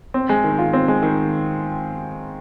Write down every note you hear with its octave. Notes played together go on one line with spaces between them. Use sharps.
C4
G#3
D#3
F4
C4
G#3
D#3